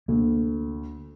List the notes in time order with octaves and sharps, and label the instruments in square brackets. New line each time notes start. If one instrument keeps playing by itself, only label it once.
[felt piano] D2 [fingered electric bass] A#3